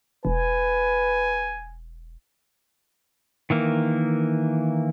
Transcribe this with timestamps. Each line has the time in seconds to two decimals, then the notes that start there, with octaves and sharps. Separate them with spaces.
0.25 E1 B4 G#5
3.50 D#3 E3 A#3